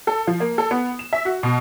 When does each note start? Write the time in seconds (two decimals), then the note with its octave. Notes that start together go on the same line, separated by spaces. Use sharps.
0.07 A4
0.27 F3
0.40 A#3
0.58 A4
0.71 B3
0.99 E7
1.13 E5
1.25 F#4
1.43 B2